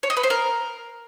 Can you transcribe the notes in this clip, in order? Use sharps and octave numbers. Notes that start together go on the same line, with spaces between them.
C#5
D#5
B4
C5
A#4